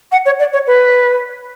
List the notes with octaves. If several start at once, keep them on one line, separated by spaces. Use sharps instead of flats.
F#5
C#5
D5
C#5
B4